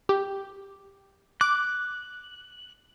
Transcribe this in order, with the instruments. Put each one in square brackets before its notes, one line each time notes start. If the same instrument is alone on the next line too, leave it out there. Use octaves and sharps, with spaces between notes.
[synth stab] G4
[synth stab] D6 [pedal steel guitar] F#6